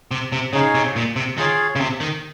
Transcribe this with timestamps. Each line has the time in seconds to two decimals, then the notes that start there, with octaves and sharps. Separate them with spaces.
0.11 C3
0.32 C3
0.53 C#3 D#4 G#4 C#5 F5
0.75 C3
0.96 A#2
1.16 C3
1.38 D#3 F4 G#4 C#5 F5
1.76 C#3
1.80 C3
2.01 D#3